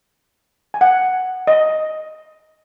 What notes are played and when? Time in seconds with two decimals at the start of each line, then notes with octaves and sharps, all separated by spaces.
0.74 G#5
0.81 F#5
1.47 D#5